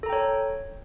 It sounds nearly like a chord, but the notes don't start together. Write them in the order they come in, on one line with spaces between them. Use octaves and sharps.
A4 A#5 G5 C#5